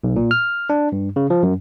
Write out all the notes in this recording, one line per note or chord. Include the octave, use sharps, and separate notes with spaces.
B1
A#2
F6
D4
G2
C#3
F3
F#2